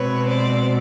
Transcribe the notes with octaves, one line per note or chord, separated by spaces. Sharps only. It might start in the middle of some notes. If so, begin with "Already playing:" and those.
Already playing: B2 G#3 C4 B4 C#5
C5 D5